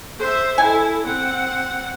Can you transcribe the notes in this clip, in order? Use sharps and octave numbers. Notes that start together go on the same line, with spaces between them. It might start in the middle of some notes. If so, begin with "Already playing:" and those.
C5 E5
E4 A4 G#5
C4 F#5